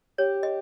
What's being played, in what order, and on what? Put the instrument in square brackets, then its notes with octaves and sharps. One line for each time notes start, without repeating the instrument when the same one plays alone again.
[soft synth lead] G4 [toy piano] C#5
[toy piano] D#5